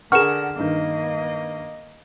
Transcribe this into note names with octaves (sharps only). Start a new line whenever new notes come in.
D3 G#4 A#4 F#5 C#6 F6 E7
G2 D#3 A#3 D#5